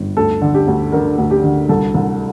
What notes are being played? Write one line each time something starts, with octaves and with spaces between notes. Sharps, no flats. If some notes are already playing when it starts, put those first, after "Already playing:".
Already playing: G1
D2 A4
D3
G4
D2
D3 A#4
D2
G4
D3
C2 A4
C2